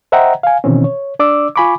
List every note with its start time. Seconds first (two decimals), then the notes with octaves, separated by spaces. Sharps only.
0.12 C5 D#5 E5 F#5 G5 A#5
0.43 F5 G#5
0.64 B2 D#3 E3 C4 C#4
0.84 C#5
1.19 D4 D5 D6 E6
1.56 F4 G#5 B5 C#6 D6